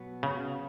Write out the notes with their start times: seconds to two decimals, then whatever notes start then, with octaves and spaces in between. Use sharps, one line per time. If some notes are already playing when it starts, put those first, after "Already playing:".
Already playing: B2 F#3 B3 F#4
0.23 C#3